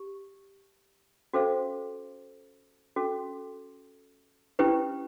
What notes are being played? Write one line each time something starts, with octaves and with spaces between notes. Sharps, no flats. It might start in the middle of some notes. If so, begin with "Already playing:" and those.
Already playing: G4
C#4 F#4 A4 C5 F5
C#4 F#4 A4
C#4 E4 G4 B4